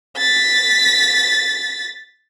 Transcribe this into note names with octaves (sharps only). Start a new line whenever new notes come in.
A6 B6